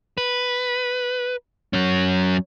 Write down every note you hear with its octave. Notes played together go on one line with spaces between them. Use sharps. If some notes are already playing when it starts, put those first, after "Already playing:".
B4
F#3 C#4